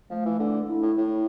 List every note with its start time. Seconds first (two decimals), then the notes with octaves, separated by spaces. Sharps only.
0.10 F3 A3
0.25 E3
0.40 D3
0.68 E4
0.82 A2
0.98 A2